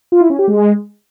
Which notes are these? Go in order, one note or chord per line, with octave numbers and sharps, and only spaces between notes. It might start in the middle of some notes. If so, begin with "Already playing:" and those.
F4
E4
C#4
G4
G#3